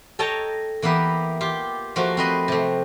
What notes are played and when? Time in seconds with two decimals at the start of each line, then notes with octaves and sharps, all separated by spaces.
0.19 A4 C#5 D#5 G5 A5 A#5
0.82 E3 A#3 B3 E4 G4
1.41 F4 G4
1.96 F3 A3 A#3 F4 F#4
2.17 C4 B4 D#5
2.48 C3 A3